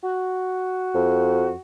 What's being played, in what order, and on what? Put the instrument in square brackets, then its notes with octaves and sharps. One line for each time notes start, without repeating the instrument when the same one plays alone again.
[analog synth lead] F#4
[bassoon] F2